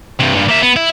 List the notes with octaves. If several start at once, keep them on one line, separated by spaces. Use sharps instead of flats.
G2 C3
G2 A#2
A#3 E5
B3
E4